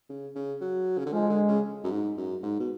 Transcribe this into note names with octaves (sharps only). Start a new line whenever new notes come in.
C#3
C#3
F#3
C#3
D3
F3 G#3
D3
C#3
F#2
G#2
F#2
G#2
B2